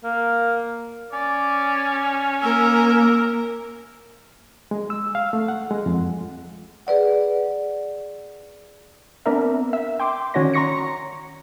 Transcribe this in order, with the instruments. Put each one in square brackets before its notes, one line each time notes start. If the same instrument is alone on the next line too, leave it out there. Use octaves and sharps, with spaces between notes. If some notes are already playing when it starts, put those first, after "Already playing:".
[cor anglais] A#3
[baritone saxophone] C#4 [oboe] D5
[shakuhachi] A#3 [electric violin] A#4 [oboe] E6
[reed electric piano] G#3
E6
F5
A3
F#5
G#3
F2
[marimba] G#4 B4 D5 F#5
[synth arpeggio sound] B3 C4 D4 A#4 E5
E5
G5 C6 D6
D#3 C#4 F#4 C#5 D5 A#6
A#5 C6 C#6 A#6 C#7